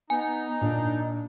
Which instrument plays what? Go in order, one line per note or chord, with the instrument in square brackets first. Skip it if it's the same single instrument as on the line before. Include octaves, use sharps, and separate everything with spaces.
[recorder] B3 [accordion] D#4 [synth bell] G#5
[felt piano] A#2 [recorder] D4